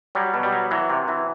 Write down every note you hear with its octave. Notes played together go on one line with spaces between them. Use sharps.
F#3 G3
B2
G3
F#3
E3 F#3
C3
E3